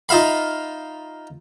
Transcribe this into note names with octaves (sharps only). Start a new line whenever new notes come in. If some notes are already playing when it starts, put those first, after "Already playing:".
D#4 F4 E5 F5 B5